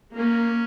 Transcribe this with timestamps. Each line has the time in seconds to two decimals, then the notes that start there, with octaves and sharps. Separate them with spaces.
0.15 A#3 C#4